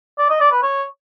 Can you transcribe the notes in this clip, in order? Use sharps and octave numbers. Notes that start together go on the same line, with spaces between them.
D5
D#5
D5
B4
C#5